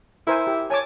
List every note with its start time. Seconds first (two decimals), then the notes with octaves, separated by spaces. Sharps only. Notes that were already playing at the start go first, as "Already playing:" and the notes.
0.27 E4 A#4 C5 G#5
0.47 G4
0.70 C#5 G#5 A5 D6